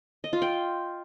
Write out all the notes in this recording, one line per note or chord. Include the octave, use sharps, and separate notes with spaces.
D#5
F4
G5